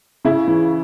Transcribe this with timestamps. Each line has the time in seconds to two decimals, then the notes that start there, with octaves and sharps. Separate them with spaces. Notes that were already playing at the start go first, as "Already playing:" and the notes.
0.25 C#3 E4
0.48 E3